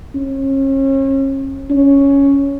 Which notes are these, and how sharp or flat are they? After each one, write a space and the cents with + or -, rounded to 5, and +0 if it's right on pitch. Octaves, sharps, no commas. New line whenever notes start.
C#4 -35
C#4 +5